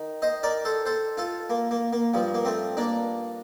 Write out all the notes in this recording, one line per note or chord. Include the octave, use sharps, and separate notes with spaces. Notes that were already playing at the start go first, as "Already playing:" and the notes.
Already playing: D#3
C5 D#5
A#4 D5
A4 C5
A4 C5
F4 A4
A#3
A#3
A#3
G2 F3
A#3
A3 C4
A#3 D4